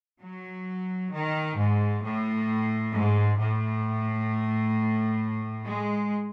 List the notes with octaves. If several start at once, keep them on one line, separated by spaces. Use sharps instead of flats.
F#3
D#3
G#2
A2
G#2
A2
G#3